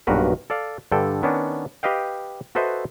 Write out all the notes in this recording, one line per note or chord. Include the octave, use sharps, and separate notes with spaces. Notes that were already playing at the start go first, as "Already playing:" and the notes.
B1 G2 A#2 F#4 A#4 B4
A4 D5 F5
G2 D3 A4 G5
D#3 B3 C#4 D4
G4 B4 D#5 F5 G5
F#4 A4 B4 C5 D#5 E5